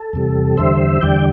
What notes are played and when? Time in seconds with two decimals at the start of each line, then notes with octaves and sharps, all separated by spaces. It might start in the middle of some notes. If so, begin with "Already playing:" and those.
Already playing: A4
0.13 E2 C3 G3
0.57 E2 D3 G3 C5 E5
1.01 E2 D3 G3 D5 G5